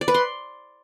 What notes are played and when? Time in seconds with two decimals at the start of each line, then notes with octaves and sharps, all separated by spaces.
0.01 D5
0.08 B4
0.14 C6